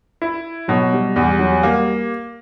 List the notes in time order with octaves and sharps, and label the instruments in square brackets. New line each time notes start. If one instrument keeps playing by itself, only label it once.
[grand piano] E4
[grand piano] B2 [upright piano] F#3
[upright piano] G3
[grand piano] E2 [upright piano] G3
[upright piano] F#3
[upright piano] G3 [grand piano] A#3